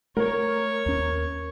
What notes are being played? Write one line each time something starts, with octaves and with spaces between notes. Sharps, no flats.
A3 A#4 C#5
D#2 C#4